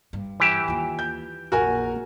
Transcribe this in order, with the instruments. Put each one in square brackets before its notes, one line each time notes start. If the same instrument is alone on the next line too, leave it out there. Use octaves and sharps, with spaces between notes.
[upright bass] G2
[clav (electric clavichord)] E3 G4 E5
[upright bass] D#2 F4
[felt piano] G6
[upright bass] A#1 F2 [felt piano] F#4 A#4 G#5